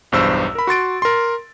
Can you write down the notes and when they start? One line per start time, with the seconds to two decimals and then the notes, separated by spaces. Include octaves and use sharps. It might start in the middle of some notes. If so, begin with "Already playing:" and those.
0.12 B1 E2 G2 C5 E6
0.55 A#4 B5
0.67 F#4 C6 A6 D7
1.02 A#4 C6